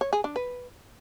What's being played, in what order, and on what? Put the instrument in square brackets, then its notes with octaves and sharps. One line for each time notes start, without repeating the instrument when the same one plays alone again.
[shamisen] C#5
G#4
D4
B4